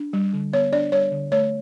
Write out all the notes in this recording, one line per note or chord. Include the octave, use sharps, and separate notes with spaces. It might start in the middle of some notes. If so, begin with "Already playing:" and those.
Already playing: D4
G3
D3
B3 C#5
D4 D5
G3 C#5
D3
A3 C#5